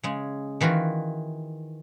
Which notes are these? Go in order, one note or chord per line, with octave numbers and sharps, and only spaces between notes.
C#3 G#3
D#3 E3 F4 F#4